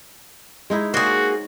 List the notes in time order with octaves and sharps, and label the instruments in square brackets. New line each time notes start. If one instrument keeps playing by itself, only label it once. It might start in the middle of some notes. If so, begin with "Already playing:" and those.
[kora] G#3 D#4 E4
[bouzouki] A#3 G#4 [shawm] F#4 [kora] C5 C#5